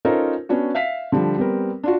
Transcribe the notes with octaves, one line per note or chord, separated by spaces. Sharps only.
C#4 D#4 F4 A4 A#4 C5
B3 C#4 D4 F#4
E5 F5 B6
D3 F3 G3
G3 B3 C4 A#4
D4 F4 F#4